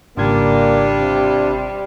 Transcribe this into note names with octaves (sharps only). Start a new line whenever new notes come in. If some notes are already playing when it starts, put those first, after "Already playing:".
G#1 C#3 G3 A#3 D4 F4 G#6
C3